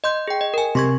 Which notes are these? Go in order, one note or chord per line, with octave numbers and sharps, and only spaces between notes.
D#5 C6 G6
G#4 G5
D#5
A#4 G#5
C3 C6 C#6 G#6